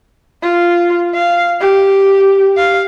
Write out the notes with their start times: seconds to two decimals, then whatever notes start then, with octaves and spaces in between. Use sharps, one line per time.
0.42 F4
1.14 F5
1.60 G4
2.56 F5